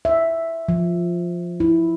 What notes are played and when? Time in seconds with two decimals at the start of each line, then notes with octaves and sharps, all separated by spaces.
0.05 E5
0.68 F3
1.60 E4